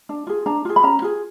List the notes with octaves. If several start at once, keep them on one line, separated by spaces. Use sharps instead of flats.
D4
F4 G#4
D4 A#5
F4 G#4
B5
C#4 A#5
F4 G#4